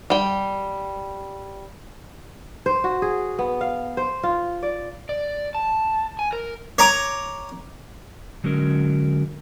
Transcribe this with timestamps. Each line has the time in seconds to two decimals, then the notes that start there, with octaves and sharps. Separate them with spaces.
0.10 G3 G5
2.66 C5
2.84 F#4
3.02 G#4
3.39 B3
3.61 F5
3.97 C5
4.23 F4
4.63 D5
5.09 D5
5.55 A5
6.19 G#5
6.33 A#4
6.78 C#5 A#5 D6
8.44 D3 F#3 G#3 C#4 A#4